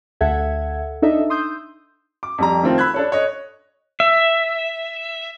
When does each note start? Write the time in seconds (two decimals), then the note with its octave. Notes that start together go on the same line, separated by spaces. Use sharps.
0.21 D2 A4 E5 F#5 G#6
1.02 D4 D#4 A4 D#5 E5
1.30 C6 D#6 E6 G6
2.23 D6
2.38 F2 G3 A#5
2.63 D#3 A3 C4 F4
2.78 B5 E6 F#6 G#6
2.94 D4 A4 C#5
3.12 C#5 D#5
4.00 E5